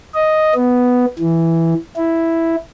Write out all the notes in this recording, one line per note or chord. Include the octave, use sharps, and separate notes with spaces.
D#5
B3
E3
E4